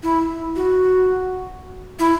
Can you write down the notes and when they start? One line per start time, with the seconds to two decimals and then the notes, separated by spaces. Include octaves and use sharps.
0.03 E4
0.56 F#4
1.99 E4